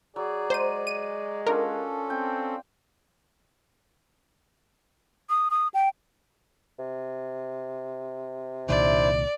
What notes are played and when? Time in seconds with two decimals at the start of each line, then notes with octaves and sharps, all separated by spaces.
0.16 F#3 G#4 D5
0.50 G#3 C5 D#7
0.87 D#7
1.47 C#4 D4 F4 A4 A#4 F5
2.10 C4 G5
5.30 D#6
5.51 D#6
5.74 G5
6.79 C3
8.69 C2 A#2 D#3 D4 E4 C5 D5